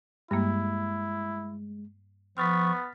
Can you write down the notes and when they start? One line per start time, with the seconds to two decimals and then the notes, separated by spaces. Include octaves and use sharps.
0.31 G2 G3 G#3 A#3 E4
2.38 F3 B3 C#6 F6 A6 B6